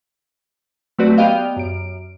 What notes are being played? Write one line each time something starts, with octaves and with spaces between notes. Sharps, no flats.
F#3 A3 C4 F#4 B4 D5
B3 G4 D5 D#5 F5 G5
F#2 D7